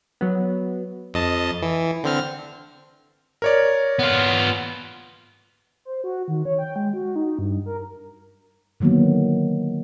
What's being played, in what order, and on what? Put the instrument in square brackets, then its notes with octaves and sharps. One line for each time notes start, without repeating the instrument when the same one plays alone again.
[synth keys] F#3 B3
[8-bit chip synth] F2 D#5 A5
E3
D3 C4 F6
[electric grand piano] A#4 C#5 D5
[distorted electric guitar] B3 F4
[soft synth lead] C5
F#4
D#3
C#5
G5
G#3
F#4
D#4
G2
A#4
[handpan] D3 D#3 F#3 A#3 B3